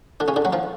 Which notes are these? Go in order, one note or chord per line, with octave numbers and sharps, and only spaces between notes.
D3 D4
C#3 C#4
D3 D4
F#3 F#4
F3 F4